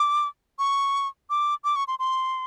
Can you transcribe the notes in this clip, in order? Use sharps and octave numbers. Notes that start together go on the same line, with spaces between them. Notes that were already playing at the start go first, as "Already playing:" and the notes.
Already playing: D6
C#6
D6
D6
C#6
C6
C6